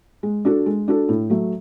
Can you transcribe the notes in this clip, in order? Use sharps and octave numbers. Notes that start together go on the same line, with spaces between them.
G#3
D4 F#4 A4
G#3
D4 F#4 A4
A2
F#3 A3